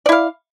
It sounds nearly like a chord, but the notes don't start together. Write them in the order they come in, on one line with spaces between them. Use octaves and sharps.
D5 E4 F5